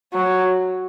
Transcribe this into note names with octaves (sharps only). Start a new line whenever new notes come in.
F#3